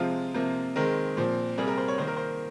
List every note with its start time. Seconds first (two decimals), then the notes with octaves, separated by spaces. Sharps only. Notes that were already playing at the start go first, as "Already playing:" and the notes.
Already playing: C3 F3 G#3 F4
0.34 C3 F3 A#3
0.76 D#3 G#3 C4 A#4
1.17 A#2 F3 C4
1.57 C3 G3 A#3 G#4
1.68 A#4
1.77 C5
1.88 C#5
1.98 D#3 A#3 C5
2.07 A#4
2.17 C5